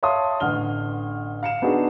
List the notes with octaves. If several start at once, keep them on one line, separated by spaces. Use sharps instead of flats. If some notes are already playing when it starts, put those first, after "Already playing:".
C#5 E5 F5 A5 C6 D#6
A1 D3 F6 G7
F5 C#7 E7
B3 D4 D#4 F#4 G#4